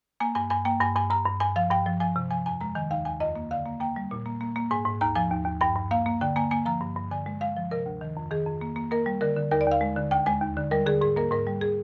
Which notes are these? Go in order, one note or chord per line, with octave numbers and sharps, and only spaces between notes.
A#3 G#5
G2 G#5
G2 G#5
A#3 G5
G2 G#5
G2 G#5
G2 A#5
G2
G2 G#5
F3 F5
G2 G5
F3
F3 G#5
C3
F3 G#5
F2 G#5
G#3 A#5
D#3 G#5
D#2 F5
D#2 G#5
F2 D#5
A#3
D3 F5
A#3
A#3 G5
G3
A#2
A#3
A#3
A#3
G#2 G#5
G#2
D#2 A#5
F3 G#5
D#2
D#2
G2 G5
G2
A#3 F5
A#3
D3 G5
A#3 G#5
A#3 G#5
F3 A#5
G2
G2
D3 G#5
G#3
G#3 F5
F3
C3 A#4
D2
D#3
F2
D#3 G#4
F2
A#3
A#3
A#3 A#4
G3
D3 A#4
D3
D#2 A#4
D5
D#2
F5
G#3
D3
D2 G5
G#3 G#5
D#2
D3
G3 A#4
D3 G#4
G#2 G#4
A#3 A#4
G#2 A#4
G3
G#4